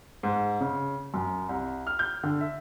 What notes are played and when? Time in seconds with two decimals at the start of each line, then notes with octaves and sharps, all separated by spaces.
0.23 G#2
0.61 C#3
1.14 F#2
1.49 C2
1.87 F6
1.99 G6
2.23 D3
2.41 E5